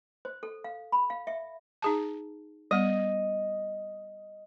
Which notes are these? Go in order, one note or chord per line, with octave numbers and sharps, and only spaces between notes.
C5
A4
F5
B5
F5
E5
D#4 G#4 A5
G3 B3 D#5